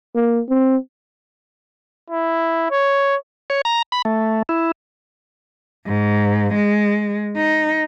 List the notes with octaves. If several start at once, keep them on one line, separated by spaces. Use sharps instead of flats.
A#3
C4
E4
C#5
C#5
A#5
B5
A3
E4
G#2
G#3
D#4